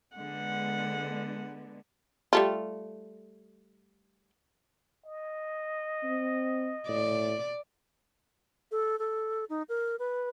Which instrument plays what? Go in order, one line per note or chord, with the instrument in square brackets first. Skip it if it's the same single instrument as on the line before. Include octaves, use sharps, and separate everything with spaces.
[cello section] D3 G#3 B3 [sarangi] F#5
[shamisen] G3 A3 F4
[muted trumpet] D#5
[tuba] C4
[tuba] A2 [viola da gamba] D5
[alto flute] A4
A4
D#4
A#4
B4